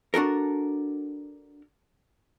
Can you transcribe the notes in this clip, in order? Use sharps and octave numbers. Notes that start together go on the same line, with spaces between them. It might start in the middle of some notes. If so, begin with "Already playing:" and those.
D4 F#4 A4 A#4